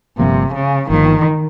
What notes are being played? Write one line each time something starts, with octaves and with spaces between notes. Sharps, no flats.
G1 G2 C3 F3 A#3
C#3
G1 G2 D#3 F3 A#3